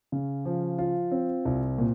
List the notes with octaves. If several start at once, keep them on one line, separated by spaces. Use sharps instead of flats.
C#3
F3
F4
C4
C2
A#2